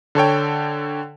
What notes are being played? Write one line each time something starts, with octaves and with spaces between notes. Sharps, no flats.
D3 A4 C#5 G5